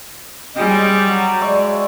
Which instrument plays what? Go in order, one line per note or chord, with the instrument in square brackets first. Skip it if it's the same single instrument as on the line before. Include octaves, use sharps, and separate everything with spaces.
[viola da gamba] G3 [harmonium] G#3 C#4 D#5 [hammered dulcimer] G5
[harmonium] F#3 F#4
[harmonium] G#3 [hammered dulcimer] D5 E5 C#6